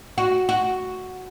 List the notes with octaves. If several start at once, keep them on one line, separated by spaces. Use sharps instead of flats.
F#4
F#4